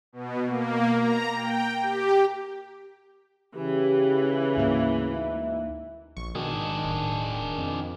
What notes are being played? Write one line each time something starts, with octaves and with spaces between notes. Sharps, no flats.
B2
A#3
A#5
G5
G4
C#3 E3 G4
D2 G#2 A#3 E5
D#4 E5
A#1 C#6
B2 D#3 D4 G#4
G#2
D1
F2